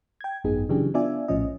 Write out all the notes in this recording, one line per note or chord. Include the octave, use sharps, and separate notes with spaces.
G5 G#6
G#1 F#2 B3 D#4 G#4
C#3 E3 F#3 D4 G4 G#4
B3 D4 F4 D5 E5 G#5
A#1 A2 F3 C#4 D#5